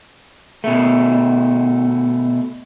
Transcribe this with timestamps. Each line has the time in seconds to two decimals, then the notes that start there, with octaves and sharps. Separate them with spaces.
0.64 B2 A3